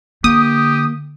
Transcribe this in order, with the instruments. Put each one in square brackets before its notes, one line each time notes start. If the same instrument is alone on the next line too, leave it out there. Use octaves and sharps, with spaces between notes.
[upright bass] D3 [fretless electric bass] A#3 [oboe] G4 [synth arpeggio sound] D#6